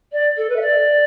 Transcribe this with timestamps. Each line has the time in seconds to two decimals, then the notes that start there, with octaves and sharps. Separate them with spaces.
0.12 D5
0.37 A4
0.49 B4
0.56 E5
0.61 D5